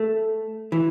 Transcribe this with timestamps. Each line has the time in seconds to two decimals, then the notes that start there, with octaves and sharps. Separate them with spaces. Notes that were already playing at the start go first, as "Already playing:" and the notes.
Already playing: A3
0.72 E3